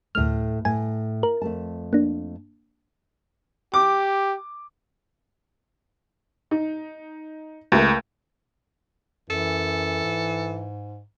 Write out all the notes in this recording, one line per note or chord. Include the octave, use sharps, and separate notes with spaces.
D2 A2 A3 F6
A2 G#5
A#4
F2 A3 A5
A#3 D4
G4 D6
D#4
C#2 A3 A#3
F#2 E3 A4
G#2